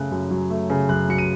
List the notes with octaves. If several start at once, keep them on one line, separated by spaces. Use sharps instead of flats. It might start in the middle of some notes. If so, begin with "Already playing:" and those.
Already playing: F#2 C#3 F#3 A3 F#6
F#2
F#3
A3
C#3
F#2 F#6
F#3 C#7
D#7